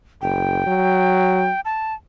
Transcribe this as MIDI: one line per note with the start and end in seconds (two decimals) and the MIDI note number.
0.22 0.63 30
0.22 1.60 79
0.66 1.51 54
1.65 1.94 81